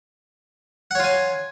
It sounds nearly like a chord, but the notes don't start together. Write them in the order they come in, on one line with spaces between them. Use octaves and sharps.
F#5 C#5 F4 G#5